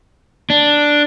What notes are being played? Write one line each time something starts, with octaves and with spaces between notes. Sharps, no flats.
D4